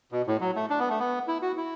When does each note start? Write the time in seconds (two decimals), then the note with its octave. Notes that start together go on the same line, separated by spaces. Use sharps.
0.12 B2
0.27 A2
0.41 F#3
0.56 A3
0.70 D4
0.79 B3
0.89 A3
0.99 B3
1.28 E4
1.42 F#4
1.57 E4